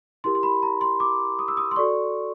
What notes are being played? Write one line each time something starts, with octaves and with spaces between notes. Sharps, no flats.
E4 G4 A#4 C6
C6
B5
A#5
C6
D6
D#6
E6
D#6
C6
F#4 A4 D5 C#6